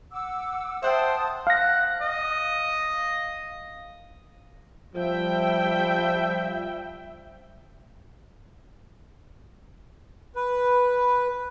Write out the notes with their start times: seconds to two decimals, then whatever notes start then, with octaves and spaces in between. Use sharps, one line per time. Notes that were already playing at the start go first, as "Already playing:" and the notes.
0.12 F#5 D6 E6
0.83 C5 E5 F#5 G5 A5 D#6
1.47 F5 F#5 A#6
2.01 D#5
4.96 F3 G3 E5 G5
10.36 B4